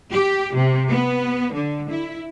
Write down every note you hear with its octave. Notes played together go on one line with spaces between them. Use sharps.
G4
C3
B3
D3
E4